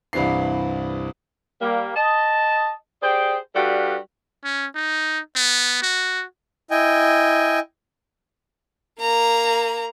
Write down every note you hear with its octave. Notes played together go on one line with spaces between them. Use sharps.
C2 G2 E3 C4 C7
G3 A#3
D#5 A5
G4 G#4 C5 D5 G5
G3 D4 F#4 A4 B4 F5
C#4
D#4
B3
F#4
E4 D#5 G5 G#5
A#3 A#5